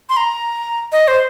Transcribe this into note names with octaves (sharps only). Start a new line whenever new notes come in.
C6
A#5
D#5
C5